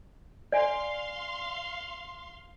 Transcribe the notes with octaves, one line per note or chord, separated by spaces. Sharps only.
D5 F5 G#5 C6